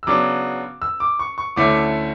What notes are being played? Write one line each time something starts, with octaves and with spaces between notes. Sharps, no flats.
E6
C#3 F#3 B3 D4 D6
E6
D6
C#6
C#6
D2 D3 A3 C#4 E4 D6